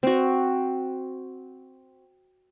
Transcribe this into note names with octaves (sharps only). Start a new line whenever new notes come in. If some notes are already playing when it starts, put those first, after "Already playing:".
C4 F#4